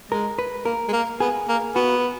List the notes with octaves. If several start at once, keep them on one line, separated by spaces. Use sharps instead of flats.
G#3 A#4
B4
A#3 A#4
G#3
A#3
B3 G#4
A#3
B3 F#4